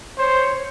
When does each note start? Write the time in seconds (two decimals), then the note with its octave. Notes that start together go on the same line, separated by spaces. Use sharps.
0.18 C5 C#5